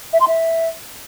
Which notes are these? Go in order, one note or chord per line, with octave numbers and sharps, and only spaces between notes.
E5
C6
E5